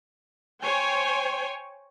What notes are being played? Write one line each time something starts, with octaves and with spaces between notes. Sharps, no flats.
C5 C#5 G5 G#5